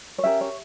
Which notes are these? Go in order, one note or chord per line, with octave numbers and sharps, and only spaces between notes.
C#5
C#4 G4 A#4 E5
C#5